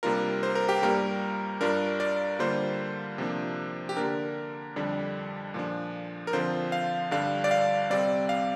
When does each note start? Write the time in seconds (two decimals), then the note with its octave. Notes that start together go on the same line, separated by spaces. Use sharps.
0.03 C3 G3 A#3 D4 F4 A#4
0.43 C5
0.55 A#4
0.69 G4
0.82 G2 G3 A#3 A#4
1.61 G2 G3 D4 F4 A#4
2.00 D5
2.39 D3 G3 A#3 F4 C5
3.18 C3 F3 A#3 D4
3.89 G4
3.97 D3 A#3 D4 A#4
4.76 F2 D3 G3 D4
5.54 A#2 F3 D4
6.27 A#4
6.33 D3 F3 C4 F4 C5
6.72 F5
7.11 G2 D3 G3 D4 F5
7.44 D5
7.51 F5
7.90 C3 G3 C4 D5
8.29 F5